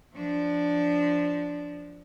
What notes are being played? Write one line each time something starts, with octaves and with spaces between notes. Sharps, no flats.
F3 D4